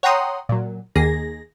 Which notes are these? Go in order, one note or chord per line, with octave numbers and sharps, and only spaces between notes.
C#5 F#5 G5 A#5 C6 D#6
A#2 F#3
D#2 D#3 A#3 G#4 A#6